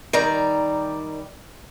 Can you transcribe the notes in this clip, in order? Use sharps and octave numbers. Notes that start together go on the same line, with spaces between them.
D#3 G3 D5 G5 A#5